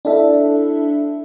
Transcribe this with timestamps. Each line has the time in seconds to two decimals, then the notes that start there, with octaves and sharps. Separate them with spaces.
0.05 D4 E4 A4 E5